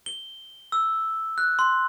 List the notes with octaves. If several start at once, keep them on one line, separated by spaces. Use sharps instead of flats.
G7
E6
F#6
C6